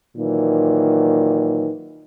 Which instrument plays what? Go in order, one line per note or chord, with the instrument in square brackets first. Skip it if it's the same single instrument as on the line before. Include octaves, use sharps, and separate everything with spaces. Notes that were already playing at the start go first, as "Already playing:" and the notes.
[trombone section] A#2 D#3 E3 F#3